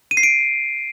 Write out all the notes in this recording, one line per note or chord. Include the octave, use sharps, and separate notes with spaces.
D#7
C7
D7